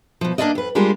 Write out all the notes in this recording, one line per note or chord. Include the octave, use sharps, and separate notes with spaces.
B2 F3
A#3 D4 F4 A#4 D5 D#5
F2 B4
G3 G#3 A#3 D4 F4 G4